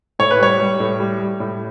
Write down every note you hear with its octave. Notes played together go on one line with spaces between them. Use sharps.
A2 C#5
B4
G3 C#5
G3
A2
G3
G3
A2